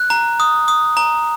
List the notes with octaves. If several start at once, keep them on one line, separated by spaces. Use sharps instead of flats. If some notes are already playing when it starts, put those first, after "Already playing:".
Already playing: F#6
A#5
D#6
D#6
A#5